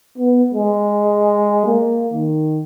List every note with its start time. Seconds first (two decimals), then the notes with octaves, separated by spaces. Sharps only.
0.18 B3
0.54 G#3
1.66 A#3
2.13 D#3